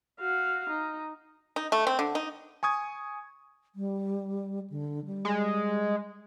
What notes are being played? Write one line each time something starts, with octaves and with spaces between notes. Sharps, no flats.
F#4 F5
D#4
D#4
A3
C4
D3
D#4
G#5 C#6 D#6 G#6
G3
D3
G3
G#3